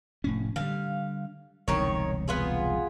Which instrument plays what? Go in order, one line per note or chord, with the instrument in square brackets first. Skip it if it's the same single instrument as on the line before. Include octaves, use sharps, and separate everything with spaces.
[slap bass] F1 A2 C#4
[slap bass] D3 G3 [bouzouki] F5
[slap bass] E1 C2 D3 [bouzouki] D#3 C#5
[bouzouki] B3 F4 G#4